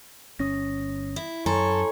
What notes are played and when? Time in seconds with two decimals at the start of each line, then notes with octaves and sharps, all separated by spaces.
0.39 G1 C#4 D#6 A#6
1.16 E4
1.46 F#2 A4 C#5 G#5 A#5 C6